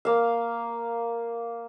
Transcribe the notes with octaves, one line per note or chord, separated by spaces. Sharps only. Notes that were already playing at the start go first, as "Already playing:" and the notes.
A#3 F5